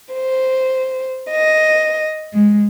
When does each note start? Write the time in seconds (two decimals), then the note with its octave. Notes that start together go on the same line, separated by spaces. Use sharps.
0.14 C5
1.31 D#5
2.33 G#3